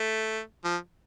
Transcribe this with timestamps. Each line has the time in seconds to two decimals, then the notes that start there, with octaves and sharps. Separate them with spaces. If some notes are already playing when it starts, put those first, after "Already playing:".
Already playing: A3
0.64 F3